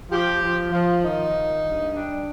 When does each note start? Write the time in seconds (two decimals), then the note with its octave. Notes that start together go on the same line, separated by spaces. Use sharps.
0.11 F3 G4
0.42 F3
0.72 F3
1.04 D#3 D#4
1.34 D#3
1.64 G2
1.94 G3 D4